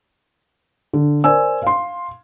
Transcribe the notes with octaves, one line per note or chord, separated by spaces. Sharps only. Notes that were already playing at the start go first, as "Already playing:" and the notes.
D3
A#4 C5 D5 G#5 E6
F5 C6